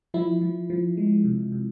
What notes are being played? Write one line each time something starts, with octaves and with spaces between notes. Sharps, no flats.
F3 E4
F3
F3
G#3
C3
C3